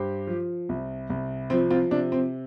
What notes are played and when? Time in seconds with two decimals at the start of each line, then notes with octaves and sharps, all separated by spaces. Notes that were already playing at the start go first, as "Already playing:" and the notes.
Already playing: G2 G4 C5
0.27 F3
0.69 C2
1.10 C2
1.50 F3 C4
1.70 C4 F4
1.91 C3 D4
2.12 C4